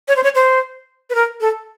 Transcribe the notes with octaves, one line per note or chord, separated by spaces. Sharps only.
C#5
C5
C#5
C5
B4
A#4
A4